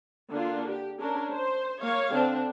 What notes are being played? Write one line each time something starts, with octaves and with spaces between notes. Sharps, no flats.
D3 A#3 D4 F4
G4
C#4 D4 A#4
C5
A#3 C#5 F5
D3 C4 D4